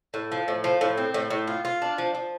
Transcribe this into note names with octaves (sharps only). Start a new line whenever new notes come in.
A2
F3
A2
F3
A2
C4
A2
A2
F4
F4
D4
F3
F3